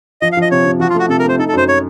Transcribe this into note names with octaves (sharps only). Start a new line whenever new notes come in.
F3 D#5
F5
F3 D#5
C3 C#5
C3
F3 F#4
F4
A3 F#4
C3 A4
A#4
A3 C5
D#4 A4
A4
F#2 C5
C#5